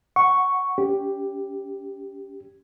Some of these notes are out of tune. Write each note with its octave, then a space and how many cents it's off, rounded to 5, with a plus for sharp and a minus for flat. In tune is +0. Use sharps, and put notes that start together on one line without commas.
F#5 +0 C#6 +0
C#4 +30 G4 +0